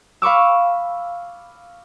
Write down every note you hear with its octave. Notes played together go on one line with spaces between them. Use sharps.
F5 B5 C#6 D6 E6